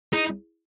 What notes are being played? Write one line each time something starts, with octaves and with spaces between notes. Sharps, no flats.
D#4 E4 G#4